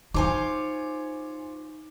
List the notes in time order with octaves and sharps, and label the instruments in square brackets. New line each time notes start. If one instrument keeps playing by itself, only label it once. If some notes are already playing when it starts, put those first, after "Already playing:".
[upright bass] D#4 [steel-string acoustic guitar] F4 C5 C#5 [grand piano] G#5 D6